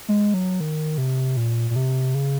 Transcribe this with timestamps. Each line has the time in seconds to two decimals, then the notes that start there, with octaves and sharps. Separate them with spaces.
0.08 G#3
0.34 F#3
0.60 D#3
0.98 C3
1.37 A#2
1.70 A#2
1.76 C3
2.14 C#3